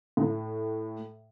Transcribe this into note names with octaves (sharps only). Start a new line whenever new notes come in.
A2